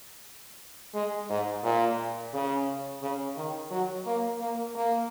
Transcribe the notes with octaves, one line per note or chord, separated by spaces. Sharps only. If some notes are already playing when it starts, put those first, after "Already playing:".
G#3
G#2
A#2
C#3
C#3
D#3
F#3
A#3
A#3
A#3